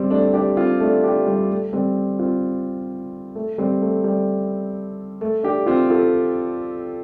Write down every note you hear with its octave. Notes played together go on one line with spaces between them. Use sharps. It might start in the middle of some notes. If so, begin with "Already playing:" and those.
Already playing: G3 C4
A3 D4
D4 G4
C4 F4
A3 D4
D4 G4
G3
A3
G3 C4
C4 F4
A3
G3 C4
A3
G3
A3
D4 G4
C4 F4
F4 A4